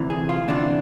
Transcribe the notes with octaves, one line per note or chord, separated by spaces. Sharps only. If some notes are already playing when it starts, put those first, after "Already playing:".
Already playing: D2 C3 E3
G#4
F4
D2 C3 E3 D4